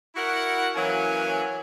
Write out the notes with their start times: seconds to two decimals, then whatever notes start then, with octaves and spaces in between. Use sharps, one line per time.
0.15 E4 F#4 A#4 F#5
0.76 E3 F#3 A#3 C#4 G#5